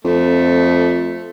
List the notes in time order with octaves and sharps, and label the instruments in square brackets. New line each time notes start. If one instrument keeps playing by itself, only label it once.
[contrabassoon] F2 [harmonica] A3